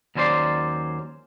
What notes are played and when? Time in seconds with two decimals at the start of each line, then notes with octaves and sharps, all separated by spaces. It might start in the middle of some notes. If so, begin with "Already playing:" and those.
0.15 D#2 F#3 C#4 C5 D5 C6